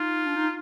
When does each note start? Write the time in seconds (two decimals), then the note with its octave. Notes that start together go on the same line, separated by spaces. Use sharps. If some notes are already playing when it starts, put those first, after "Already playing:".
Already playing: D#4 F4
0.26 D4
0.36 D#4